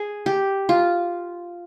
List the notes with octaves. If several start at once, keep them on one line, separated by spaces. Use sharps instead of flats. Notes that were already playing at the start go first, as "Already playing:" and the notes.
Already playing: G#4
G4
F4